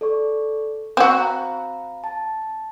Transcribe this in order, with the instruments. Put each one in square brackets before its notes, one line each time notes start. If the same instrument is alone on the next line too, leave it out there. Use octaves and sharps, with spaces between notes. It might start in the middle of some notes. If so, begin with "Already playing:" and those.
[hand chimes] A4 D5 C#6
[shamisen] C4 F#4 [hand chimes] F#6
[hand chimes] F5 A#5 B5
A5